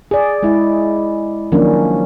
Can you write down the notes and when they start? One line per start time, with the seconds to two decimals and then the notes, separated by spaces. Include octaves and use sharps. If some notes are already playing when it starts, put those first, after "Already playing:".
0.11 G#4 D5
0.43 G#3 E4
1.52 D#3 F3 F#3 A#3 C#4 D4